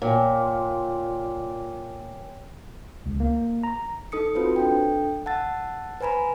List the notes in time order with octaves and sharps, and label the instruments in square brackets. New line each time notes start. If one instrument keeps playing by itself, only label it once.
[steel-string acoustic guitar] A#2 [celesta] C#5 G5 G#5
[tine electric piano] C#2
A#3
A#5
[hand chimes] D#4 A4 D#6 C#7
C4 F4 F#4 B4 C5
D4 A4 G5
F#5 A5 E6 A6
B4 C5 G#5 A#5 B5